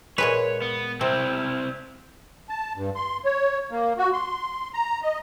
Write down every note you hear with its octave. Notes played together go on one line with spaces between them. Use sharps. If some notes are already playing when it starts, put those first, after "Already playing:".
A#2 G#3 B4 C#5
B3
C3 C4 E4
A5
G2
C6
C#5
A#3
F#4
C6
A#5
D#5